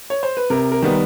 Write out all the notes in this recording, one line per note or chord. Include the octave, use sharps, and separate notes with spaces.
C#5
C5
B4
C3 A#4
A#4
D#3 G3 B3